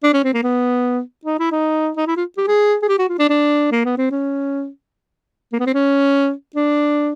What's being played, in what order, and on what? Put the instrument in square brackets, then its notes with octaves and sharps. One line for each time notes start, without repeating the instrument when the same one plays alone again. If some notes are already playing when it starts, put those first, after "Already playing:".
[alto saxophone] D4
C#4
C4
A#3
B3
D#4
E4
D#4
D#4
E4
F4
G4
G#4
G#4
G4
F#4
F4
D4
D4
A#3
B3
C4
C#4
A#3
B3
C4
C#4
D4